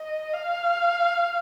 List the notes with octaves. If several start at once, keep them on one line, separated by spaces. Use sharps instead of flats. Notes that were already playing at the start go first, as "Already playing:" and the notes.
Already playing: D#5
F5